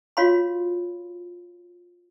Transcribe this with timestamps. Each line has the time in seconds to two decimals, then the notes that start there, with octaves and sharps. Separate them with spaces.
0.17 F4 F#4 C#5 F5 B5 C6